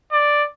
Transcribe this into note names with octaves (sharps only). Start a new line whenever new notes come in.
D5